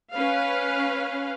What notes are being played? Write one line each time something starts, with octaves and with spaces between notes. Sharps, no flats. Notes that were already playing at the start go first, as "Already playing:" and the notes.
C#4 B4 F5